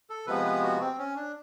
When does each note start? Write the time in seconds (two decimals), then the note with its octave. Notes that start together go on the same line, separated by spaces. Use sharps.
0.10 A4
0.27 C3 F3 G#3 B3 B4
0.45 B4
0.63 F#4
0.81 C4
0.98 C#4
1.16 D4